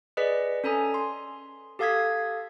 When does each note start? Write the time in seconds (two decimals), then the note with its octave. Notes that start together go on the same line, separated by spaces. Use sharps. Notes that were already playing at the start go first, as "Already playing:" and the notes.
0.17 G#4 B4 D5 D#5 B6
0.64 C#4 A4 G#5 A#5 D#6
0.94 C6
1.79 G4 A4 F5 D#6 G#6 B6